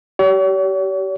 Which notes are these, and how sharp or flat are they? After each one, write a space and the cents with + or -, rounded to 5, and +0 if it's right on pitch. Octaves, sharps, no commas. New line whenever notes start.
G4 -30 C#5 +45